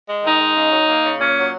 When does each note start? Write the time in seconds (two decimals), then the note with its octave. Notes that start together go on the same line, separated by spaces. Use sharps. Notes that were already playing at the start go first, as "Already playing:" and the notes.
0.09 G#3
0.24 D#3 D#4
0.41 G#3
0.56 C#3
0.72 F#3
0.88 A#3
1.04 C#3
1.19 A#2 C#4
1.36 F#3